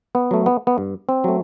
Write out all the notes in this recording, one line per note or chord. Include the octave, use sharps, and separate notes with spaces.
B3
F#3 A3
B3
B3
G2
C4
F#3 A3